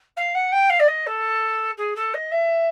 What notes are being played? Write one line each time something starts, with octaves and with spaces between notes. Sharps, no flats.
F5
F#5
G5
F5
D5
D#5
A4
G#4
A4
D#5
E5